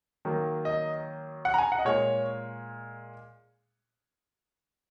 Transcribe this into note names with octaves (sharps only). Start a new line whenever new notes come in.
D#3 F#3 A#3
D#5
F#5
A#5
G#5
F#5
D#5
A#2 G#3 C#5